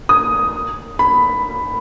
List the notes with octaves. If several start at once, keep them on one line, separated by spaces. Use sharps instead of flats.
D#6
B5